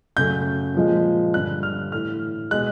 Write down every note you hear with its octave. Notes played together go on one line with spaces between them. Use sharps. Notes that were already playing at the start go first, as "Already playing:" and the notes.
F#2 C#3 F#3 A3 G6
A#2 F3 G#3
G2 D3 G3 F#6
F6
A2 E3 A3 F6
B2 G#3 F#6